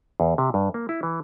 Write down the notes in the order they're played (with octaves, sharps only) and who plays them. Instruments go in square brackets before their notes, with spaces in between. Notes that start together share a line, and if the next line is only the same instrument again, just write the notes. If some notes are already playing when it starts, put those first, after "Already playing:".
[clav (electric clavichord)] E2
C3
G2
A#3
E4
E3